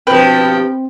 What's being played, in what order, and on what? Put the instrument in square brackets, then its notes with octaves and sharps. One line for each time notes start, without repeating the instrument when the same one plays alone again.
[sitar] G2 B2 F3 [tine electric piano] C4 [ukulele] B4 [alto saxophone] G5